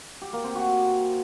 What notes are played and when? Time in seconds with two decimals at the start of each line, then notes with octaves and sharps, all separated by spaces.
0.22 G4
0.33 A#3
0.44 C4
0.55 F#4